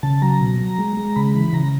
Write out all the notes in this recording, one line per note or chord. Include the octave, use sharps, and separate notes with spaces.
C#3 A5
F#3 A#5
B2
F#3
G#3
G#3
C#3 B5
E3
C#3 A#5